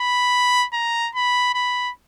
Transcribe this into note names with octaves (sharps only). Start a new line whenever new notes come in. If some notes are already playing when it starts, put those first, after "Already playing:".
Already playing: B5
A#5
B5
B5